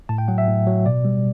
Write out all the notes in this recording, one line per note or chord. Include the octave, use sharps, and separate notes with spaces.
A2 A5
G5
F#3 F#5
E5
A2
F#3
B2 D5
G3